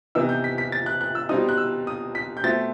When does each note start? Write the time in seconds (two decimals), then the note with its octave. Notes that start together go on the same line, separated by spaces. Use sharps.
0.15 C3 E3 B3 D#4 E6
0.29 G6
0.44 B6
0.58 B6
0.72 A6
0.86 F#6
1.01 F#6
1.15 E6
1.29 B2 G3 C4 D#4 D#6
1.49 F#6
1.58 E6
1.87 D#6
2.15 B6
2.37 G6
2.43 B2 A3 C4 A6